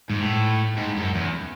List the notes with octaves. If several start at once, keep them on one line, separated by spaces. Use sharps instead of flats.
G#2
A2
G#2
F#2
E2